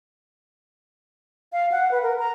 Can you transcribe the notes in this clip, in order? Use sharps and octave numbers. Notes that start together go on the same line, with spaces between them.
F5
F#5
B4
A#4
A#5